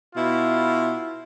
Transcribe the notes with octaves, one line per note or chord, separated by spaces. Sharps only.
B2 E4 F4